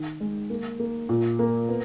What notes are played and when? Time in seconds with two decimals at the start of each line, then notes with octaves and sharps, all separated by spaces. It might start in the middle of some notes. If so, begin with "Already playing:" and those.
Already playing: D#3
0.21 G#3
0.50 A#3
0.80 A#3
1.09 A#2
1.39 A#3
1.69 B3